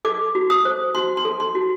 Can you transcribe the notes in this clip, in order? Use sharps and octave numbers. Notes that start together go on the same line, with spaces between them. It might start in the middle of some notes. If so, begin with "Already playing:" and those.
A4 D6
F#4
D#6
C5
F#4 C6
C6
A4
C6
F#4